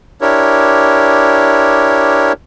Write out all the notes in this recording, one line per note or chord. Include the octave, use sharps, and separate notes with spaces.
D4 E4 G4 A#4 C#5